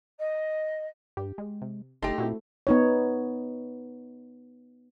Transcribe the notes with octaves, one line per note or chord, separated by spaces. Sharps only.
D#5
G2 G4
G#3
C3
F#1 A3 D#4 G4 A5 C6
A#2 C4 E4 F#4
B3 D#4 C#5